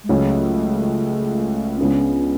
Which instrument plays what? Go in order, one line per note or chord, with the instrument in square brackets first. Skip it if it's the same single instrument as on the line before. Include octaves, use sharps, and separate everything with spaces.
[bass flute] G#3
[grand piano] C#2 C#3 F#3 C#4 [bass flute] A3
[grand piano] C#2 C#3 G#3 B3 D4 [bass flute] C#4